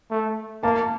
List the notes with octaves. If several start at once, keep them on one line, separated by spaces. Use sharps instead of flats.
A3
A#3 A5